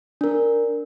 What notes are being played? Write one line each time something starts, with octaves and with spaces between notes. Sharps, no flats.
D4 A#4